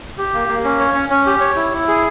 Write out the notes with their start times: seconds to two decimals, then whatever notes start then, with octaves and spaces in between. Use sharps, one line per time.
0.18 G4
0.34 A#3
0.49 A#3
0.64 C#4
0.80 C#5
0.94 C#4
1.10 C#4
1.26 G4
1.41 C#5
1.56 E4
1.73 E4
1.88 G#4